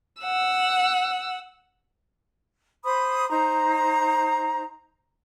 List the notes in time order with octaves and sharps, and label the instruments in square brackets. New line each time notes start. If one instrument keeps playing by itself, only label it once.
[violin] F#5 E6
[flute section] C5 B5 D#6
D#4 C5 A#5